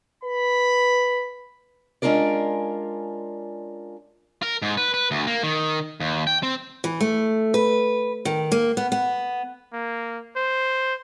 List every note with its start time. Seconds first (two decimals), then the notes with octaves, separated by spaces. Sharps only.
0.24 B4 B5
2.02 G#3 C#4 D4 F4 A#4 D5
4.43 A#4
4.62 G#2
4.77 B4
4.94 B4
5.11 D2
5.27 A#3
5.43 D#3
6.00 D#2
6.27 G5
6.43 C4
6.84 E3
7.01 A3
7.54 B4
8.25 D#3
8.52 A#3
8.77 B3
8.92 B3
9.73 A#3
10.36 C5